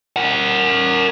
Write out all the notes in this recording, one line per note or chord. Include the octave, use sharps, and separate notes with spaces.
A#4 F#5